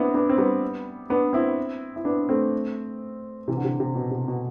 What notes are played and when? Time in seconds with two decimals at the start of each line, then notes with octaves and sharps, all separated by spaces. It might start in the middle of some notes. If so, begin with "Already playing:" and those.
Already playing: B3 C4 D4 E4
0.14 B3 D4
0.29 C4
0.38 G3 B3
1.10 B3 D4
1.33 C4 E4
1.96 E4
2.05 B3 D4
2.29 A3 C4
3.48 C3 E3
3.57 D3
3.65 C3
3.80 C3
3.95 B2
4.11 C3
4.28 B2